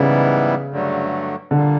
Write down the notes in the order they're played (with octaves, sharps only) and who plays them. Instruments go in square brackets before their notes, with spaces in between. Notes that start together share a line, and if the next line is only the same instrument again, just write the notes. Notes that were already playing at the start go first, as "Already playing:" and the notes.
Already playing: [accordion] G#2 E3 G3 B3 E4 [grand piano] C#3
[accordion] G2 D3 F#3 A3
[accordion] A#2 G3 A#3 [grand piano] D3